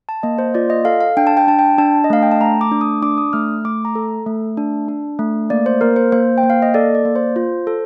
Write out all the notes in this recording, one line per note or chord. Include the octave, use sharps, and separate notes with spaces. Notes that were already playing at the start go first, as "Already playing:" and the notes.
A5
A#3 D#5
C5
F4 D5
D#5
A4 F5
F5
D4 G5
A5
G5
D4 A5
G5
D4 A5
D#5
A3 F5
G5
A5
A3 A#5
D6
D4
D#6
D4 D6
D#6
A3 F6
A3 D6
A#5
A4
A3
D4
D4
A3
A#3 D5
C5
A#3 A#4
C5
A#3 C5
G5
A#3
F5
D#5
A4 D5
D5
A#3
C5
F4
A4